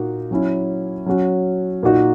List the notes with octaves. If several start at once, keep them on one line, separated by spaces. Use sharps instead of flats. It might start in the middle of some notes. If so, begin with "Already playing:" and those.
Already playing: A#2 A#3 D#4 F#4
F#3 C#4 E4
F#3 C#4 F#4
A#2 A#3 D#4 F#4